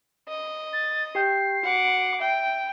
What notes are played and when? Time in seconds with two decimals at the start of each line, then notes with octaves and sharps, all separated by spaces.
0.28 D#5
0.73 A6
1.15 G4 G5 G6 C7
1.63 F#4 F#5 D6
2.20 E5 G5